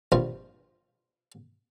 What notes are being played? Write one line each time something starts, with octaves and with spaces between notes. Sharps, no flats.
A#1 G2 C4 F4 C5